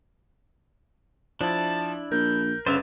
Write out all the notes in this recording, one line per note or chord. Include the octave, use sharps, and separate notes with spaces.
F3 D4 E4 A5
A#1 A#4 G6
G1 C#3 B4 C5 E5 F5 A6